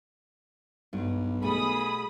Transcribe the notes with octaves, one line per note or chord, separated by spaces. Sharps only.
B1 G2
B2 G3 A3 G#4 B5 D#6